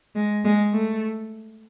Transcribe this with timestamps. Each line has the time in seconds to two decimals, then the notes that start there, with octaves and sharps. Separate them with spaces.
0.15 G#3
0.45 G#3
0.73 A3